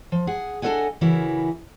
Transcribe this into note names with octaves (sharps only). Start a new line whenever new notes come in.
F3
G#4 F#5
D4 A4 A#4 D#5 F#5 G#5
C#3 E3 E4 F#4 A#4 B4